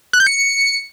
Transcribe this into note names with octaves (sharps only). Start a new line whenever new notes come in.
F#6
G6
C#7